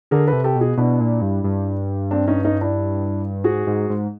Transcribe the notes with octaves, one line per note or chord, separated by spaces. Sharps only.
D3 G#4 A#4
A4 B4
C3
G4 A4
B2
F#4 G#4
B2 D4 E4
A#2
G2
G2
C4 D4
C#4 D#4
C#4 D#4
D4 E4
G#2 F#4 G#4
G#2
G#2